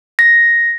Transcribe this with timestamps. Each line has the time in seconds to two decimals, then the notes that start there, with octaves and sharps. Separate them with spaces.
0.19 A#6